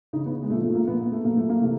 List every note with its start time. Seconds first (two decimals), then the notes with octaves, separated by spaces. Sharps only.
0.13 C#3 E3 D#4
0.26 B3
0.43 G#3
0.50 A#2 A3
0.55 F3
0.62 A3
0.75 A#3
0.87 A#2 F3 B3
1.12 A3
1.24 A#2 F#3 A#3
1.37 A3
1.50 A#3
1.61 C3 E3 A3